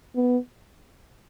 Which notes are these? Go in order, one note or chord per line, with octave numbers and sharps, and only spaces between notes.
B3